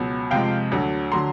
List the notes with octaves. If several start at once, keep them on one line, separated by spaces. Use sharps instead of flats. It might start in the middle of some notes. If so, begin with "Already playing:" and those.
Already playing: C#2 B2 F#3
F2 C3 F3 G#3 F5 G5
D2 D3 F#3
D3 F#3 A#5 C6